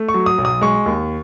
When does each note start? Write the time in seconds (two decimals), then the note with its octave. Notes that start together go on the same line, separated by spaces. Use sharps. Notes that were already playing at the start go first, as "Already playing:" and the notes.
Already playing: A3
0.09 C#6
0.14 F#3
0.26 D#6
0.38 B1
0.45 D#6
0.61 G#3 C#6
0.86 D#2